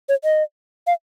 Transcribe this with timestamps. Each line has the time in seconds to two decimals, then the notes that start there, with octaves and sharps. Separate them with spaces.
0.09 C#5
0.24 D#5
0.87 F5